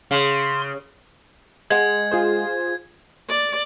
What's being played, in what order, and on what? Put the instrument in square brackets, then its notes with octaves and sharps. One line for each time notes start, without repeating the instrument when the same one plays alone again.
[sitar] C#3 [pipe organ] C6
[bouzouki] G#3 F#5 [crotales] G#6
[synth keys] F4 G#4 C5
[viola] D5